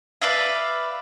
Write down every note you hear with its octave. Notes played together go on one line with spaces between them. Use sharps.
B4 D5 E5 F5